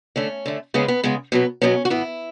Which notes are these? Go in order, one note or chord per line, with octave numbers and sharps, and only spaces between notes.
D3 A3 C#4
D3 A3
C#3 G#3 B3 C#4
B3
C#3 G#3 B3
B2 F#3 B3
B2 F#3 B3 C#4
F#4
A2 E3 B3 E4